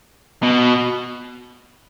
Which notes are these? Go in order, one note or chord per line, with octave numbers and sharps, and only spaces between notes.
B2